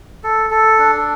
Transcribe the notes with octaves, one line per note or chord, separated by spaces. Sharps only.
A4
A4
D4